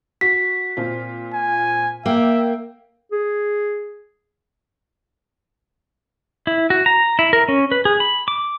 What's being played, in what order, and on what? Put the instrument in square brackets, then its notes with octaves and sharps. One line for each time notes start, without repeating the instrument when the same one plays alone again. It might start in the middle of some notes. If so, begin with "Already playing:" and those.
[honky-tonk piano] F#4 [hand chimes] B6
[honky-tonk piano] A#2 C4 F4
[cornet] G#5
[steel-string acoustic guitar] A#3 [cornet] E5 [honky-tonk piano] G5
[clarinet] G#4
[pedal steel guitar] E4
F#4
A#5
E4
A#4
C#4
B4
G#4
B5
D6